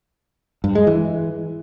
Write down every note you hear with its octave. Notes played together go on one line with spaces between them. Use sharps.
G2
G#3
E3